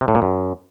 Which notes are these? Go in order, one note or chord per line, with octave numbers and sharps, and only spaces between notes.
C3
A2
A#2
F#2